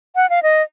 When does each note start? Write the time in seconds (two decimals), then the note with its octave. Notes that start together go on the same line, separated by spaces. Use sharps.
0.16 F#5
0.30 F5
0.43 D#5